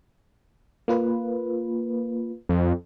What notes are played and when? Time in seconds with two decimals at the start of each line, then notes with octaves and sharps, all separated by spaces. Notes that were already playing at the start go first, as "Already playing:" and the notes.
0.88 A#3 F4 B4
2.49 F2